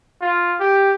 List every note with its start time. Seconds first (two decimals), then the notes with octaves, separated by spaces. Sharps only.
0.21 F4
0.60 G4